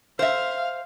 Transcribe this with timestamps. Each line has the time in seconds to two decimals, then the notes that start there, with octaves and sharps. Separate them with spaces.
0.19 C5 E5 F5